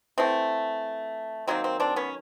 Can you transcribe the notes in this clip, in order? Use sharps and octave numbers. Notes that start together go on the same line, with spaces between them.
E3 A3 C4
D#3 F#3 A#3 C4
C4
C4 D4
B3 C#4